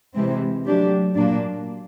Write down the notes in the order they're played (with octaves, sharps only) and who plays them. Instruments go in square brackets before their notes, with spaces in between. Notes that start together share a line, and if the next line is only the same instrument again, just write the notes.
[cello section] C3 E3 G#3 C4
F#3 A3 D4 G4
A#2 F#3 A#3 D4